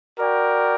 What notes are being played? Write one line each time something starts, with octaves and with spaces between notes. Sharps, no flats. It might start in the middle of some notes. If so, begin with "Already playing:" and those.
F#4 A#4 D5 G5